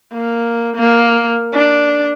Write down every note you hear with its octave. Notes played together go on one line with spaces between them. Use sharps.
A#3
A#3
D4